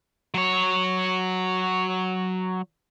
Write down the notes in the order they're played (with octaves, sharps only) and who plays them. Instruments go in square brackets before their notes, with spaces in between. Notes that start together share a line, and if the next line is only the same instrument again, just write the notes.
[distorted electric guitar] F#3 C#5